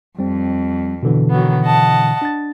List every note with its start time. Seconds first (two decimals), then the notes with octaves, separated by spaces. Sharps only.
0.19 F2 G3 C4
1.03 B2 D3 E3
1.31 D#3 F#3 B3
1.65 D#5 F#5 A5
2.22 D4 A6